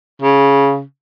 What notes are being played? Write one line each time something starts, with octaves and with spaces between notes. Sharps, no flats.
C#3